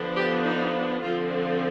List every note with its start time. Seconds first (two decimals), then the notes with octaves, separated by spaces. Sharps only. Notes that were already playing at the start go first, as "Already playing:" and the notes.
Already playing: D3 F3 B3 D4
0.15 G4
0.43 D#4
1.00 D3 F3 C4 F4
1.29 D4